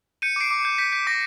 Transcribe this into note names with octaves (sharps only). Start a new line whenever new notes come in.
G6 C#7 D#7
D6 C7 D7
D6
G6
G6 B6
G6 B6
D6 A#6